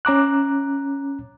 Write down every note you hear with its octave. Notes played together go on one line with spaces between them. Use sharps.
C#4 A#5 D6 F#6